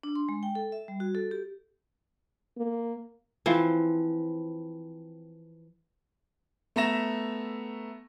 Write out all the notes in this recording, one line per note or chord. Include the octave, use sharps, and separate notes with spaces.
D4
C6
G#3
G5
A4
E5
G3
F#4
A4
G4
A#3
E3 F3 C4
A3 B3 E5 A#5 A#6 E7